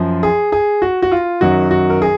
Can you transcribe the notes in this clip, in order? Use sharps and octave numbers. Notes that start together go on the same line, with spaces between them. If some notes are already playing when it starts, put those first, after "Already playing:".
Already playing: F#2 F3
G#4
G#4
F#4
F#4
F4
F#2 D#3 F#3 F#4
F#4
A#4
G#4